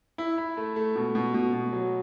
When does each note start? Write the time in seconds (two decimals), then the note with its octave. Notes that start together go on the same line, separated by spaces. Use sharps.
0.18 E4
0.38 E4
0.57 A3
0.76 A3
0.96 B2
1.15 B2
1.34 B2
1.53 B2
1.73 F#3